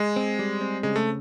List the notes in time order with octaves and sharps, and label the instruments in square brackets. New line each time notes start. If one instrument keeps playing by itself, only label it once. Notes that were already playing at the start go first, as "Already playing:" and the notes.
Already playing: [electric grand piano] G#3
[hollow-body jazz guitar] C4
G3
C4
[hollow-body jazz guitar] C#3 [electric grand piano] G#3
[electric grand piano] A3